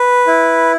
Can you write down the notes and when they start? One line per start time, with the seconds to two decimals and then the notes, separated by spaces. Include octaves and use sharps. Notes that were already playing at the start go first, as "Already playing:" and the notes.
Already playing: B4
0.27 E4